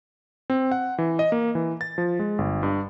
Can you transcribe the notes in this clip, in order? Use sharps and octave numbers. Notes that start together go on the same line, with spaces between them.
C4
F#5
E3
D#5
A#3
E3
A6
F3
G#3
G1
G2